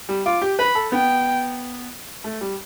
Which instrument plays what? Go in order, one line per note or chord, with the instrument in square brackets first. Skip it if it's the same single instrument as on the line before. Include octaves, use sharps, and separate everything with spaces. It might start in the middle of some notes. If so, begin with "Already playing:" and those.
[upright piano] G3
[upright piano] F4 [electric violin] D6
[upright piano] G4
[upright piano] B4 [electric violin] B5
[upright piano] A4
[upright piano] B3 [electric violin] G5
[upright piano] A3
G3